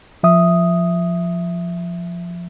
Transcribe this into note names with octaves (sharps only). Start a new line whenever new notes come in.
F3 E5 D#6